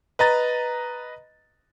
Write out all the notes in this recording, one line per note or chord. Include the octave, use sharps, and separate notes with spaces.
B4 D#5 A#5 A6